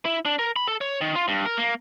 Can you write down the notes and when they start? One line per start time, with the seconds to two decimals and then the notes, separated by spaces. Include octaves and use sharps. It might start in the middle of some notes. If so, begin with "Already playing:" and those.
0.05 E4
0.25 D4
0.39 A#4
0.56 B5
0.68 A4
0.81 C#5
1.01 D#3
1.15 F4
1.28 G2
1.46 A#4
1.58 A#3